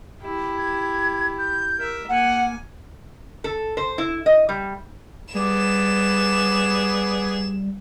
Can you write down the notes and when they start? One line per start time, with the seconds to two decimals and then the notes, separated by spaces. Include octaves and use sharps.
0.22 E4 G4
0.58 G#6
1.38 G6
1.79 A#4 E5
2.09 A#3 F#5 G#5
3.44 A4
3.77 C5
3.98 E4
4.26 D#5
4.49 G3
5.34 G3 B3 G#4 D5 E7